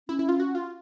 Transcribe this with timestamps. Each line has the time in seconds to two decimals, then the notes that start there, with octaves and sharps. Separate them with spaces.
0.09 C#4 E4
0.19 E4
0.29 F4
0.40 F#4
0.55 F4